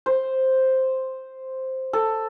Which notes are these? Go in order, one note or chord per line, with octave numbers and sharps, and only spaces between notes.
C5
A4